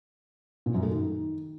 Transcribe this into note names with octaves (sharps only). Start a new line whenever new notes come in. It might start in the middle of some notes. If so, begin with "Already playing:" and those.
A#2
F#2
A3
D#3